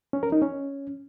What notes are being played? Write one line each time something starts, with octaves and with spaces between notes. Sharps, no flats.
C#4
A#4
D#4
C#4